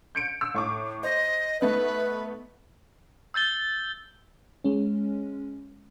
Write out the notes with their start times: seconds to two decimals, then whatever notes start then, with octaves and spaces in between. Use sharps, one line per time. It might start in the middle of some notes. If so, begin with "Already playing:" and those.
0.15 G6 C#7 D7
0.41 E6
0.54 A2 C#6 D6
1.03 C5 D#5
1.61 A3 B3 D#4 B4
3.34 E6 G6 A6 G7
4.64 G#3 C#4